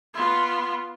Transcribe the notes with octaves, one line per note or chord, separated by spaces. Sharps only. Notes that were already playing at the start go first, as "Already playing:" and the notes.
B3 F4